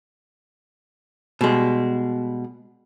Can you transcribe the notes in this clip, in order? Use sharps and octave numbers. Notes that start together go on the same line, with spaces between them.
B2 G3 G#3